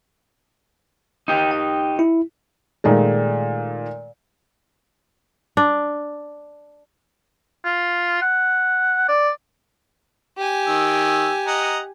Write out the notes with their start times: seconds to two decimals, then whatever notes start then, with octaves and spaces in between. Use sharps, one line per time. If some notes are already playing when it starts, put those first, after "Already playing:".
1.28 D#4 G4
1.51 G5
1.99 E4
2.84 A#2 D#3 G#3 A3
5.57 D4
7.65 F4
8.22 F#5
9.08 D5
10.37 G4 G#5
10.67 D#3 E6
11.47 D#5 F#5 A#5